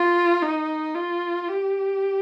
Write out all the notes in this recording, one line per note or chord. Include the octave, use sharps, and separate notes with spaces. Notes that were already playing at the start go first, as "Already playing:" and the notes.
Already playing: F4
D#4
F4
G4